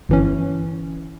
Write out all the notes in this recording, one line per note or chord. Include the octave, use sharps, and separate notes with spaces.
G1 E3 C#4